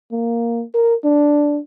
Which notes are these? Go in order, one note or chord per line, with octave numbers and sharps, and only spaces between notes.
A#3
A#4
D4